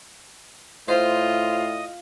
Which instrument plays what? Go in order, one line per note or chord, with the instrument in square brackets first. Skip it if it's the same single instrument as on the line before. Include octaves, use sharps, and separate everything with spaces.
[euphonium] A2 [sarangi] F4 [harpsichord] C5 [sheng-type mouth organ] D#5